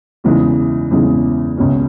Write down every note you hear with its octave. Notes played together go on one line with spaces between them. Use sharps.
E2 C#3 E3 G#3 D#4
E2 C#3 E3 G#3 D#4
C#2 B2 G#3 C#4